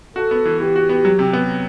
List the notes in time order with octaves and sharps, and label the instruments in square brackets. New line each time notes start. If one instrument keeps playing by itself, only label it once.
[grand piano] F#4 [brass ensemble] A4
[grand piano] B3
E3
[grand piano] E3 [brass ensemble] G4
[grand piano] F#4
B3
F#3
C3
B3